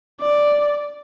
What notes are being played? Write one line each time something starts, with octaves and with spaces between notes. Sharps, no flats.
D5